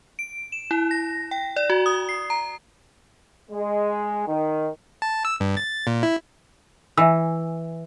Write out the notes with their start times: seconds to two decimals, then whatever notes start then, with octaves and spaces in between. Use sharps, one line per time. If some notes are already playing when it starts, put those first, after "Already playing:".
0.19 D7
0.52 E7
0.71 E4
0.91 A#6
1.31 G5
1.56 D5
1.70 F#4
1.86 D#6
2.09 C7
2.30 A#5
3.51 G#3
4.28 D#3
5.02 A5
5.25 E6
5.40 G2
5.57 A6
5.87 A#2
6.03 E4
6.97 E3 E5 G#5 E6